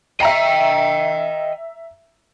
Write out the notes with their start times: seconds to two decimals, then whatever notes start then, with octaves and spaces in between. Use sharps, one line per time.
0.20 D#5 E5 G5 A#5 C7